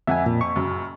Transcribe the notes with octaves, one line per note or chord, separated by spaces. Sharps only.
F2 E5 F#5 G#5
A#2
C#6
F#1 F#2